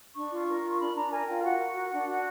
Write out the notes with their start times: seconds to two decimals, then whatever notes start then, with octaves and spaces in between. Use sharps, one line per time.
0.15 D4 C#6
0.31 F4
0.48 A#4
0.63 F4
0.80 D4 B5
0.95 D4 A#5
1.12 A#4 G#5
1.27 F4 G5
1.38 G5
1.43 F#4 F#5
1.59 A#4
1.75 F#4
1.92 D4
2.08 F#4